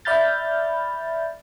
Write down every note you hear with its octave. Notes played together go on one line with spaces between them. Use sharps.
D5 E5 B5 F6 G6 A6